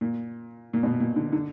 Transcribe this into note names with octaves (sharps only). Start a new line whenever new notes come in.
A#2
A#2
B2
A#2
D3
D3